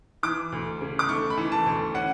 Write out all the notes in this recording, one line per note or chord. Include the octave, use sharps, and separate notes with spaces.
E3 D6
D2
C#3
D6
A3 C#6
B5
E3
A5
D2
C#4 F#5